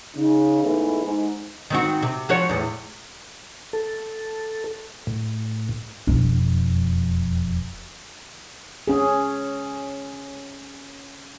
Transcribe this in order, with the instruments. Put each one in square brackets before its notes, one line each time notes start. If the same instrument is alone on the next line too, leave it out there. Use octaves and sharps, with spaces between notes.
[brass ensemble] C#3 D#4
E2 G#2 E3 A3 D#4
G#2
[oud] D#3 C4 F#4
C3
F3 F#4 C#5
E2 A2
[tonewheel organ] A4
A2
[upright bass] E1 F2
[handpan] C#4 G#4